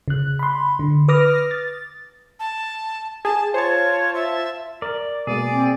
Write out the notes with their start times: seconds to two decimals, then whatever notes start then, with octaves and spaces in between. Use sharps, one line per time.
0.08 C#3 F#6
0.39 B5 C6
0.79 D3
1.08 B4 D6 D#6 F6 A#6
1.51 A6
2.40 A5
3.25 G#4 A5
3.54 F4 C5 C#5 A5
4.14 E5
4.82 A#4 D5
5.27 B2 G#3 A#3 G#4 D5
5.52 C4